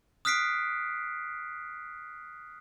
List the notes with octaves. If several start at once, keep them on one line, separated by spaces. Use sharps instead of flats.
D#6 F6 F#6 B6 C7 D7